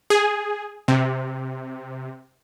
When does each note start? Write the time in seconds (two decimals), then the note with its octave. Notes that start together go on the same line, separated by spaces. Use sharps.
0.10 G#4
0.88 C3